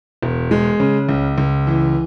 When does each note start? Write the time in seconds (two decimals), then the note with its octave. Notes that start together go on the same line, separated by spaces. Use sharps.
0.22 E1
0.51 G#3
0.80 C#3
1.09 C#2
1.38 C#2
1.67 E3